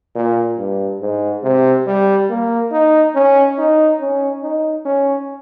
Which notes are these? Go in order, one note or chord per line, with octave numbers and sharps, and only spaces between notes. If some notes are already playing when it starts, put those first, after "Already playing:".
A#2
G2
G#2
C3
G3
A#3
D#4
C#4
D#4
C#4
D#4
C#4